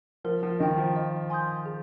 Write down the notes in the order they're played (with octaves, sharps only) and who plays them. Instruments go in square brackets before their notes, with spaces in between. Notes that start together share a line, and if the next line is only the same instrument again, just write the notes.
[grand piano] F3 [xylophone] A#4
[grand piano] F3
[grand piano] D#3 [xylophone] D#5 G5
[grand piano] F3
[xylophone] D#5
G#5 C6 D#6 G6
G#4